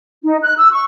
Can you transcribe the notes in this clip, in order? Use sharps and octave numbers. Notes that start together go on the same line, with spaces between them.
D#4
F#6
E6
C#6